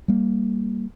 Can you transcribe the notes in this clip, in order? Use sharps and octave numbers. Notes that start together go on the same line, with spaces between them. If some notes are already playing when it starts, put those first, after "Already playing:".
G3 A#3